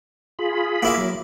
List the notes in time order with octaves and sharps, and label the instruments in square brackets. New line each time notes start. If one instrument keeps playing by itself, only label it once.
[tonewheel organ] F4 G#4 B5
[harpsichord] A#3 E4 F5
[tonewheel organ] F#3